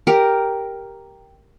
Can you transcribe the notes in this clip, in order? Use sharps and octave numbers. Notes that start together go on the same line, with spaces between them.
G4 A#4